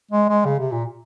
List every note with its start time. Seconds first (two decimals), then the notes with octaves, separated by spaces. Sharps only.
0.11 G#3
0.29 G#3
0.45 C#3
0.59 C3
0.72 A#2